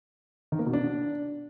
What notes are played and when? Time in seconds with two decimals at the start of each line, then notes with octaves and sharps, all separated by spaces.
0.52 D#3
0.59 A#3
0.66 B2
0.73 D4